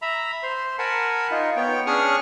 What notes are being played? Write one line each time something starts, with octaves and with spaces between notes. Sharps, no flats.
E5 A#5 B5
C5 C6
A#4 F#5 G#5 A5 B5
D#4 F4
B3 C#5 G5
C#4 D4 G#4 C#6 D#6 F6